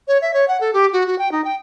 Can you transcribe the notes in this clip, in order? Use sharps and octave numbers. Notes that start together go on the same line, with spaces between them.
C#5
E5
C#5
F#5
A4
G4
F#4
F#4
G5
D#4
G5